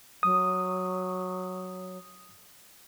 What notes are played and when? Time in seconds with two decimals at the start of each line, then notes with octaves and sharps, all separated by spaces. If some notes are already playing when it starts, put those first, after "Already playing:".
0.23 F#3 D#6